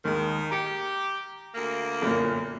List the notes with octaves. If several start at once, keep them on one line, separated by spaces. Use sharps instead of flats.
D#2 D#3 G#3
G4 A#5 C#7
D2 A#3
G1 F#2 A#2